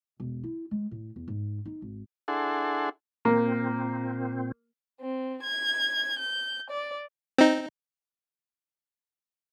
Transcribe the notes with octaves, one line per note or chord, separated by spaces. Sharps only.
E1
E4
G#3
A2
E2
G#2
D#4
G#1
D4 E4 G#4 A4 F#5 C6
A#2 A#3 C4
C4
G#6
G6
D5
C4 D#4